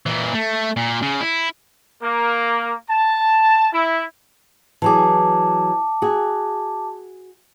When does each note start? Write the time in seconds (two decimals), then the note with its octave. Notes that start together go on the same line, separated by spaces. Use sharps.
0.06 A#2 E3
0.34 A3
0.77 A#2
1.02 C#3
1.21 E4
2.02 A#3
2.90 A5
3.73 E4
4.82 E3 F#3 G#4 A5 D6
6.02 F#4 G#4